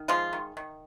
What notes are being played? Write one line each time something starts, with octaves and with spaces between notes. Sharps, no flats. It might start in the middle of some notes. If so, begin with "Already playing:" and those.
Already playing: D#3
F3 G#3 F4
D#3
D#3